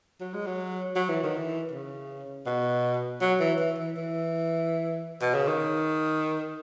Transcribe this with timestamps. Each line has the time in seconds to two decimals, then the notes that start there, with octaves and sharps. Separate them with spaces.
0.21 F#3
0.34 G#3
0.46 F#3
0.96 F#3
1.09 E3
1.23 D#3
1.37 E3
1.72 C#3
2.46 B2
3.21 F#3
3.40 E3
3.60 E3
3.78 E3
3.97 E3
5.22 B2
5.34 C#3
5.48 D#3